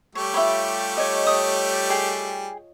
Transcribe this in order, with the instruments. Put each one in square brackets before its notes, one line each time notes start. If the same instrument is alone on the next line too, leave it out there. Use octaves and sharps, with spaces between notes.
[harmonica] G3 A3 G4 [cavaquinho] C#5
[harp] F4 G5 B5 [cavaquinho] C#5 E5
[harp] C#5 D#5
[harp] D#5 [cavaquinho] D#6
[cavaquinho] G#4 G5